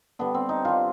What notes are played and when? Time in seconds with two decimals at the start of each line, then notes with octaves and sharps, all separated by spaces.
0.19 D3 G3 B3
0.35 C4
0.49 D#4
0.65 D3 G3 F4